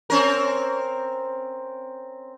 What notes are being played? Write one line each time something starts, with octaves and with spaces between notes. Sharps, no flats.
C4 C#4 A#4